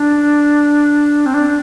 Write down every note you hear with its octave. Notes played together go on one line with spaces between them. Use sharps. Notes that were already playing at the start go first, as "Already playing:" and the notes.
Already playing: D4
C4
D4